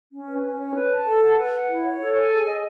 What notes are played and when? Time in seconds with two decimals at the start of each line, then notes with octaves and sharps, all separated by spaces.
0.11 C#4
0.28 B4
0.42 C#4
0.58 C#5
0.75 B4
0.90 A5
1.05 A4
1.21 F#5
1.38 B4
1.52 F#5
1.68 E4
1.84 C#5
1.99 A4
2.15 G#5
2.30 G#4
2.46 D#5